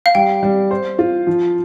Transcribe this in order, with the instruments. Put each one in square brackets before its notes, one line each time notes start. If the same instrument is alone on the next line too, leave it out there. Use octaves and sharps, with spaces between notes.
[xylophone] F5
[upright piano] G3 [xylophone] G5
[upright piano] G3
C5
F4
F3